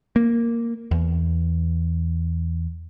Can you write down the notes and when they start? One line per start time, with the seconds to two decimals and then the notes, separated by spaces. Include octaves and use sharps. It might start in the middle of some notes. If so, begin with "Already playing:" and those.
0.16 A#3
0.91 E2